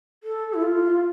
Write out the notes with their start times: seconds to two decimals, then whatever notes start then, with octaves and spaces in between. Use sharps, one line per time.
0.23 A4
0.54 E4
0.62 F4